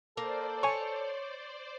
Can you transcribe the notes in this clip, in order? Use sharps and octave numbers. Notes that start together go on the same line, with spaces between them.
A#3 A4 C5 D5
C#5 G#5 C#6